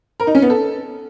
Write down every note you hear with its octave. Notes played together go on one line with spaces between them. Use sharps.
A#4
D#4
C#4
B3
A4